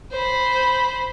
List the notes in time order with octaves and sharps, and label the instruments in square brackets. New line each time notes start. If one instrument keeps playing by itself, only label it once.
[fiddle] C5 B5